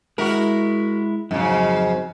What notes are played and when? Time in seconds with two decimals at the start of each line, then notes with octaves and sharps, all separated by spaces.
0.18 G#3 E4 F#4 A#4
1.31 F2 G#2 C#3 F#3